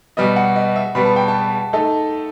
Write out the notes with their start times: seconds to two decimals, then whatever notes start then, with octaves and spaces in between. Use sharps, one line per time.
0.17 B2 G3 B3 D#5
0.36 F#5
0.56 D#5
0.76 E5
0.95 B2 G3 B3 B5
1.05 A5
1.16 G5
1.28 A5
1.73 A3 D#4 A4